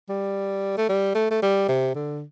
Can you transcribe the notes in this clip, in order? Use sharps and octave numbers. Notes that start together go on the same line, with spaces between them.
G3
A3
G3
A3
A3
G3
C3
D3